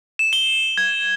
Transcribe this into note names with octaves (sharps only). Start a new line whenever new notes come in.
E7
G7
G#6